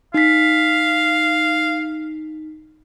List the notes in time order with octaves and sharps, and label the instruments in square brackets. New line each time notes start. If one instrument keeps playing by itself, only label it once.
[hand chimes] D#4 B6 [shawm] F5